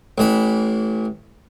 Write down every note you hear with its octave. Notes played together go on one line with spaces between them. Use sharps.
A1 E3 B5